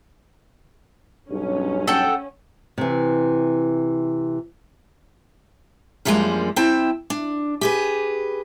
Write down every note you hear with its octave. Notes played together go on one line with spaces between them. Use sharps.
B1 G2 C#4
A4 F#5 G5
C3 E3
F#2 F3 G3 G#3 A#3 D4
C4 E4 G5 A5
D4
G4 G#4 B4